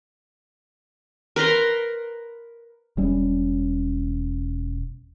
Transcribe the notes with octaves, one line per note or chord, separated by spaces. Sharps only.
A#4 B4 A#5 C6
E1 G3 C#4